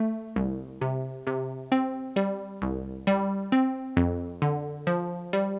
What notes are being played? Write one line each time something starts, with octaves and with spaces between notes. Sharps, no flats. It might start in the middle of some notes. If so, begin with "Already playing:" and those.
Already playing: A3
C2
C3
C3
C4
G3
C2
G3
C4
F2
D3
F3
G3